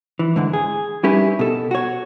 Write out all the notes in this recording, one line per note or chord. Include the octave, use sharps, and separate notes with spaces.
E3
G#2 D3 E3
G#4
G3 C#4 D#4 E4 G4 B4
B2 A4
F#4 C#5